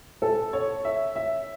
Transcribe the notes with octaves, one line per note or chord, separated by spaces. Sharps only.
A4
C#5
E5
E5